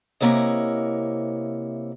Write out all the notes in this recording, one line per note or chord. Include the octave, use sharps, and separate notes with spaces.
C3 E3 A#3 E4 C#5 D#5